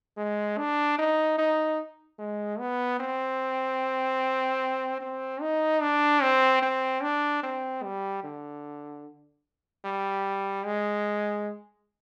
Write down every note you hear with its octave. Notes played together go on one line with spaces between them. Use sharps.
G#3
D4
D#4
D#4
G#3
B3
C4
C4
D#4
D4
C4
C4
D4
C4
G3
D3
G3
G#3